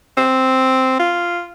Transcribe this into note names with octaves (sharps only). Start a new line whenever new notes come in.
C4
F4